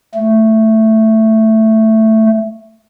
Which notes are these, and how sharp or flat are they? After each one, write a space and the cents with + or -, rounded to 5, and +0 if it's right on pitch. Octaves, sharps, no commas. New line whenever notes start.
A3 +5